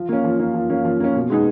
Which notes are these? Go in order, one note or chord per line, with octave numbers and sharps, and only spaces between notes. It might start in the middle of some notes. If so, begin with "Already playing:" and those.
Already playing: F3
A#3 C#4
F3
A#3 C#4
F3
A#3 C#4
F3
A#3 C#4
B2
G#3 B3 D#4 G#4